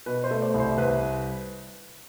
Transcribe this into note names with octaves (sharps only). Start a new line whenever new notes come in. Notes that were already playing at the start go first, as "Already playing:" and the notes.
B2 B4
C5
A3
D5
C2
C5
C2 B4